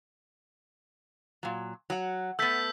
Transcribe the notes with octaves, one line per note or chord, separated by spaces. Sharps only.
A#2 F#3
F#3 F#5
A3 B3 E6 G6 B6